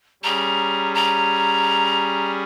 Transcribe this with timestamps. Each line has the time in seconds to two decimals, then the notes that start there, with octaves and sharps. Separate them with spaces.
0.23 G3 C#4 G#4 A#5
0.94 A#5